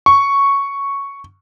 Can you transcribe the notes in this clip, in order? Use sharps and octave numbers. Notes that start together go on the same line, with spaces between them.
C#6